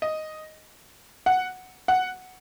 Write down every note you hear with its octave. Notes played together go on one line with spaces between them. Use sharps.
D#5
F#5
F#5